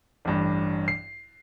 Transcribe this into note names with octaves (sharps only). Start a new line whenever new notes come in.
A1 G2
C7